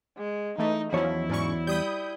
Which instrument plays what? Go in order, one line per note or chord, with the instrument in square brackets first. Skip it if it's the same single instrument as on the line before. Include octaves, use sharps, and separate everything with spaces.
[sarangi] G#3
[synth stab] E3 A3 [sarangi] D#4
[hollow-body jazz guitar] E2 C#5 [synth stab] F3 C#4 [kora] F#3 [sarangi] E4
[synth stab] G#2 C#4 C#6 [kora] F#3 C5 D5
[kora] G3 [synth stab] B5 D#6 G6